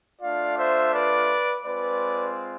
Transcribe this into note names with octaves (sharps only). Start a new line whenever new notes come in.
A3 D4 F4 D5 F5
C5 E5
B4 D5
G#3 C4 F4 B4 D5